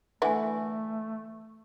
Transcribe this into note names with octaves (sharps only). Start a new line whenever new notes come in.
D3 E3 A3 B3 E5 G#5